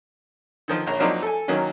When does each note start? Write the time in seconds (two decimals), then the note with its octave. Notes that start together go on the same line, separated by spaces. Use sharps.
0.68 D3 D#3 F3
0.87 A#1 C#5 A#5
1.00 F3 F#3 A#3 C4 D4 D#4
1.22 A4 G#5
1.48 D#3 F#3 A#3 C#4